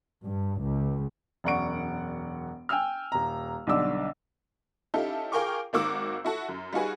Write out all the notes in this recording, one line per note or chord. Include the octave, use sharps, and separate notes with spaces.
G2
C#2
E1 F#2 D5 F#5 C#6 D7
G5 G#5 E6 F6
D#1 A#5
B1 D3 G3 D6 E6
C#4 D#4 E4 G4 A4 F5
F4 G#4 A#4 G5 C#6 D6
G#1 D#3 A#3 F#4 D6 E6
E4 F#4 A4
F#2
G3 D#4 F4 F#4 G#4 B4